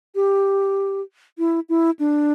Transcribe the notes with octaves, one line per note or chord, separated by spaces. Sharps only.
G4
E4
E4
D4